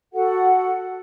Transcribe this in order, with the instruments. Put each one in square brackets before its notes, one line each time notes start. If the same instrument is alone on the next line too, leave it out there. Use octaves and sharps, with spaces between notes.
[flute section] F#4 A4 F#5